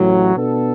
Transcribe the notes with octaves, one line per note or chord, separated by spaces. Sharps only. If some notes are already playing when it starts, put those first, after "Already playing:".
Already playing: A1 A2 F#3
B2 B3 D4 A4